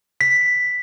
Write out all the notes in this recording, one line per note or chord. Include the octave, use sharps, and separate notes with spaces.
B6